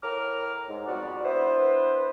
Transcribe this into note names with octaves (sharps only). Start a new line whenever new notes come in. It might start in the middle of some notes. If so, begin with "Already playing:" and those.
A2 A#4 A#5 D6 F6
G#2
F2 G3 B3 F#4 D5
B3 D4 E4 B4 C5